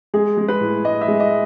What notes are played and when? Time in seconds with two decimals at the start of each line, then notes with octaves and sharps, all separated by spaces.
0.14 G#3 G#4
0.37 G#3
0.48 B4
0.61 A2
0.84 G#3 D#5
1.01 E5
1.08 G#3
1.20 D#5